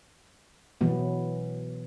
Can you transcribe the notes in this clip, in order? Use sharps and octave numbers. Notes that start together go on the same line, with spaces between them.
B2 E3 F#3 B3